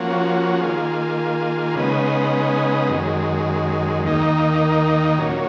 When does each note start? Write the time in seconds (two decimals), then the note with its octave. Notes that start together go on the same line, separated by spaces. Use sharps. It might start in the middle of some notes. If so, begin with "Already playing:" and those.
Already playing: F3 A#3 C#4 F#4
0.60 D#3 A#3 F4 G#4
1.76 C#3 G#3 B3 D#4
2.90 F#2 D#3 G#3
4.04 D#2 D#3 A#3 D#4
5.18 A#2 F#3 C#4